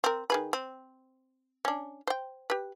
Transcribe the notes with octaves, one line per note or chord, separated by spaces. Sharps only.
C4 A#4
D#3 G#4 B4
C4
C#4 D4
C5 G5
G4 B4